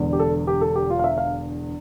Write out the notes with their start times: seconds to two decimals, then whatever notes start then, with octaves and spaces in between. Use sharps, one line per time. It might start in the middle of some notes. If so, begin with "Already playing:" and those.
Already playing: E1 E2 D3
0.13 G4
0.19 A4
0.47 G4
0.61 A4
0.76 G4
0.90 F4
0.99 F5
1.04 E5
1.18 F5